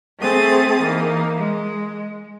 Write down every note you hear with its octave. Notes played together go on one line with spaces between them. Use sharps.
A3 C4 G#4 D#6 A6
E3 A#3 D#4
G#3